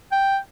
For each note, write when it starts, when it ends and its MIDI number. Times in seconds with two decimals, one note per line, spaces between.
0.12 0.38 79